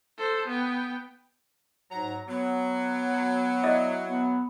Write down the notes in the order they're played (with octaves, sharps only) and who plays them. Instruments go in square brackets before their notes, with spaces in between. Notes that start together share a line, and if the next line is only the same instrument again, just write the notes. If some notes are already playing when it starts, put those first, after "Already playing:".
[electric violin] A4 C5
B3 G5
[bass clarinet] G#2 [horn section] F#3 A#5
[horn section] F#3 [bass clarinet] B3
[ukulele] E4 D5 D#5
[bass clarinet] B3